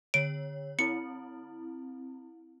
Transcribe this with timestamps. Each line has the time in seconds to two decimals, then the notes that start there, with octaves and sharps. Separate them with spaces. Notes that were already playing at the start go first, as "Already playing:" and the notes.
0.14 D3 C#5 D7
0.79 C4 E4 C#7